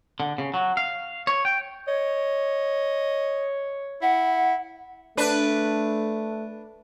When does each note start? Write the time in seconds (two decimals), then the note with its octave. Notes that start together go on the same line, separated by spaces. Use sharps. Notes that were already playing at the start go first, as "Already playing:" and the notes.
0.20 D3
0.38 C#3
0.54 F#3
0.77 F5
1.27 C#5
1.45 G5
1.88 C#5 D#5
4.02 E4 F#5
5.17 A3 D4 B4